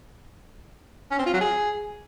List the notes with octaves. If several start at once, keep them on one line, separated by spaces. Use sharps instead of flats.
C#4
C4
F4
F#3
G#4